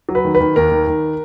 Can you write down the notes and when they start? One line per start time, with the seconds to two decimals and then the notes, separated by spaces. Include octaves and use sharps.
0.09 F#3
0.15 B4
0.25 D#3
0.35 B4
0.40 D#3
0.56 D#2 A#4
0.72 D#3
0.87 D#3